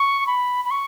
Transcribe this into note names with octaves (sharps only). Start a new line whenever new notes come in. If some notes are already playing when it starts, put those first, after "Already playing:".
Already playing: C#6
B5
B5
C#6